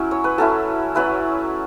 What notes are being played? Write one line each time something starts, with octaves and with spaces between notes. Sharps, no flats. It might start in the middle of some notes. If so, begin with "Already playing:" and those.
Already playing: F#3 C#4 E4
C#5
B4
F#3 C#4 E4 A4
F#3 C#4 E4 B4